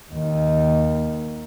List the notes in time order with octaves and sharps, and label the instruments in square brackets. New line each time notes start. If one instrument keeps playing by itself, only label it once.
[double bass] D#2 D#3